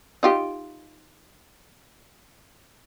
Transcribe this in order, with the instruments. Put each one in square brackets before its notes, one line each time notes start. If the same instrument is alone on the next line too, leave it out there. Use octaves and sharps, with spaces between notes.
[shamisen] D#4 F4 G4